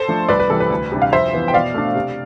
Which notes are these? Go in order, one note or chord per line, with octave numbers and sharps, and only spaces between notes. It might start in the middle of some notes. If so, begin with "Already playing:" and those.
Already playing: A4 C5
F3 A3 D4
C2 B4 D5
B4
C3 E3 G3 A4
B4
D2
C3 G3 D4
F5
F2 C5 E5
E3 B3
G5
B2 D5 F5
A3 D4
C3